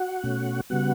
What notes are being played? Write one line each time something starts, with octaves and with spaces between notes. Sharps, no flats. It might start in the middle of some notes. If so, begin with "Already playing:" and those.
Already playing: F#4 F#5
B2 A3 C#4
C#3 G3 B3 F#4 F#5